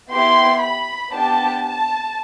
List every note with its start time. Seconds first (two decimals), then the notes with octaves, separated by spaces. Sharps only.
0.11 B3 E4 G4 C6
0.61 B5
1.12 B3 D4 G4 A5
1.63 A5